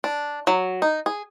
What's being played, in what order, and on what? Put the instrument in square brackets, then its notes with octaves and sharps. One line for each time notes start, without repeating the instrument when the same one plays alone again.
[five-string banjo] D4
F#3
D#4
G#4